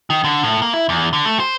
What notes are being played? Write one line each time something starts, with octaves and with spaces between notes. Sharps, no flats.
D#3
D3
A2
A#3
E4
E2
D3
A3
C5